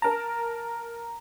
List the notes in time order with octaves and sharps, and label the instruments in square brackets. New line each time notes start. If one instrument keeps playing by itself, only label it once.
[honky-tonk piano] A#4 A5 [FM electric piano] A#5